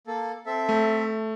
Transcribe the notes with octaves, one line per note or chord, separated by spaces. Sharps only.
A#3 A4
C4 A4 E5
A3